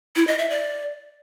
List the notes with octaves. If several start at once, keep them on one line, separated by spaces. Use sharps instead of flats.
E4
D#5
E5
D5